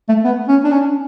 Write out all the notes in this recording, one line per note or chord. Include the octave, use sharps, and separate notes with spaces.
A3
B3
C#4
D4
C#4